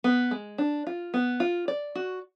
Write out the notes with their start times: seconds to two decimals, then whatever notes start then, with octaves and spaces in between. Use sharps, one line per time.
0.04 B3
0.31 G#3
0.58 D4
0.87 F4
1.14 B3
1.40 F4
1.68 D5
1.95 F#4